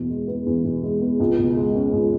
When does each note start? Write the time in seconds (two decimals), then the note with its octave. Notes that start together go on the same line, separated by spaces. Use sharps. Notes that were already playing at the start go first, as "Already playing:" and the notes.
Already playing: E2 B2
0.09 G#3
0.27 B3
0.46 E2
0.64 B2
0.83 G#3
1.01 B3
1.20 C#2
1.38 B2
1.56 G#3
1.75 C#4
1.93 C#2